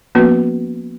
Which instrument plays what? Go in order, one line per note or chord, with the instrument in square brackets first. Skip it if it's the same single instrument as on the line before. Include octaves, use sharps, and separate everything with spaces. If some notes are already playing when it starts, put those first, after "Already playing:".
[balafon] F3 A#3 B3 C#4 F#4 B4